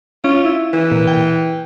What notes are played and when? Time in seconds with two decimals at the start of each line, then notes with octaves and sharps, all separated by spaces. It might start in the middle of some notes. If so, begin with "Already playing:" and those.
0.24 C#4 F4
0.45 E4
0.74 E3
0.92 A#2
1.07 G5